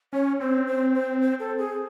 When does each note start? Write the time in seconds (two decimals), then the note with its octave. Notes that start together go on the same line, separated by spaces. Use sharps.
0.13 C#4 C#5
0.40 C4 C5
0.67 C5
0.95 C5
1.22 C5
1.40 A4
1.58 G#4